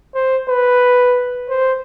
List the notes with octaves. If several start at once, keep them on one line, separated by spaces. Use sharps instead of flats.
C5
B4
C5